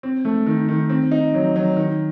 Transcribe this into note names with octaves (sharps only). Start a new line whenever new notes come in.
C4
A3
D#3
D#3
C4
D#4
F#3
F#3
D#3